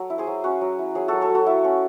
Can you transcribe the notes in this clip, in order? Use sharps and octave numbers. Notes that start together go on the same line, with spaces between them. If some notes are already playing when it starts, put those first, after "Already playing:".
Already playing: F#3 A4
E4
G#4 C5
F#3
C#4 F#4
F#3
E4
F#3 G#4
F#3 F#4 A4
A4 C#5
F#3
F#4 A4
E4
C#4